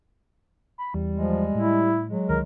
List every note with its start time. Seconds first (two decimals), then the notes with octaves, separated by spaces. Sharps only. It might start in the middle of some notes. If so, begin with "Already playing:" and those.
0.78 B5
0.94 E2 G3
1.16 F3 G#3
1.55 A2 E4
2.09 F#3 G#3
2.29 C#2 D#3 E3 A#4